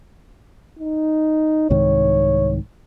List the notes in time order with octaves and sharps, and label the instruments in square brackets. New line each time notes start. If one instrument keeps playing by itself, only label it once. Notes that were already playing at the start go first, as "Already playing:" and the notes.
[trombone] D#4
[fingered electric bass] C2 G#2 D#3 [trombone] C#5